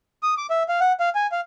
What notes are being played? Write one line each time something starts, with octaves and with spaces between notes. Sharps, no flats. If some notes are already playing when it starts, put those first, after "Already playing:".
D#6
D6
E5
F5
F#5
F5
G#5
F5